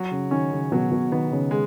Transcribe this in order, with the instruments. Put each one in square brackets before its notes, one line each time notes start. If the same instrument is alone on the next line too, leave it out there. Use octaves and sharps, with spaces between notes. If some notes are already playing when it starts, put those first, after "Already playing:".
Already playing: [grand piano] F#3
[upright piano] C#3
[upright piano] D#3 [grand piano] C#4
[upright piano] C#3
[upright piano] B2 [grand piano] F#3
[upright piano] B2
[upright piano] D#3 [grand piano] B3
[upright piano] C#3
[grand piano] G#3